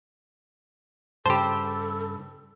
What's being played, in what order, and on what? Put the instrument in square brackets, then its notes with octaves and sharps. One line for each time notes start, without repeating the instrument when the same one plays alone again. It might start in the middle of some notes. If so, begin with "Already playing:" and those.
[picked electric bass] G2 C#3 [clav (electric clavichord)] G4 C5 [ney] A4 [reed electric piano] A5 B5